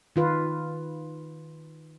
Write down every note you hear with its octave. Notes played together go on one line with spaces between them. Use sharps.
D#3 F4 B4